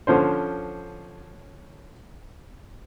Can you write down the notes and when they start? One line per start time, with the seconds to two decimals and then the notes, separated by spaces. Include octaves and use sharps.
0.07 D3 F3 C#4 C5